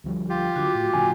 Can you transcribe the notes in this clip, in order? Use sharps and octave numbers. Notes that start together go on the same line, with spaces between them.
D2 F3 G3
F4 G4
D3 F#3 F#4 D6
A2
A2 C#3 F3 G#5